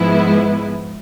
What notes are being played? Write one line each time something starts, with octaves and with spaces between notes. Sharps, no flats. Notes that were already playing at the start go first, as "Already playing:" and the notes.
Already playing: G#2 F3 G#3 B3 E4